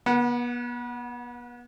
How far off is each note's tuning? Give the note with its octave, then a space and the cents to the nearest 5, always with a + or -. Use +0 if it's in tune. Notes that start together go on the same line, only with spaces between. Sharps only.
B3 -35 F#5 +0